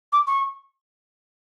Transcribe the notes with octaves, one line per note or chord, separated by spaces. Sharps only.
D6
C#6